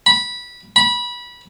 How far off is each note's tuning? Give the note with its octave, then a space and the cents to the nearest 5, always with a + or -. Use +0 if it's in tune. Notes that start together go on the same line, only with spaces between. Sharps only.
B5 -15
B5 -20